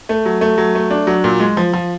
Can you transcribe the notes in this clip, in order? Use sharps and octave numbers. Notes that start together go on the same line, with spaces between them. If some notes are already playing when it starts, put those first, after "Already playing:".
A3
F#3
A3
F#3
A3
D4
F#3
A#2
G#3
F3
F3